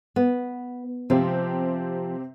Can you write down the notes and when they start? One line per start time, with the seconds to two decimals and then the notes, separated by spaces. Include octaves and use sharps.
0.16 B3
1.10 C3 F3 C4 G4